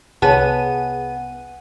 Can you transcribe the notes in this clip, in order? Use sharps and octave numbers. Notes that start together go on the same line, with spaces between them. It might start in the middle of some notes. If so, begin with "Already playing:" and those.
C2 B3 G#4 C#5 F#5 A5 D#7